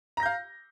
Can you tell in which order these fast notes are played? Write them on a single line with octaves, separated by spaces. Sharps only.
A#5 A#6 G6 F5